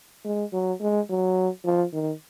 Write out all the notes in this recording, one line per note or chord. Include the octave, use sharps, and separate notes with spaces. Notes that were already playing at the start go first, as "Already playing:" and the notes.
G#3
F#3
G#3
F#3
F3
D#3